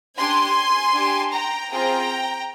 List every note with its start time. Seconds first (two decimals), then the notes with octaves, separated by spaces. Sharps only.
0.17 D4 G4 G#5 C6
0.94 D4 G4
1.32 G5 A#5
1.70 C4 F4 G#4 G5 A#5